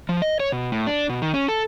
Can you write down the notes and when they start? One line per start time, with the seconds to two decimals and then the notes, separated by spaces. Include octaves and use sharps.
0.09 F3
0.22 D#5
0.40 C#5
0.52 B2
0.72 A2
0.87 D4
1.10 B2
1.22 D#3
1.34 C#4
1.48 A4